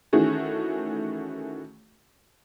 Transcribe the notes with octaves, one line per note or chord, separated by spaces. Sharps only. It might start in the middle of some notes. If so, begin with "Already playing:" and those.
D#3 E3 A3 C#4 F#4 G#4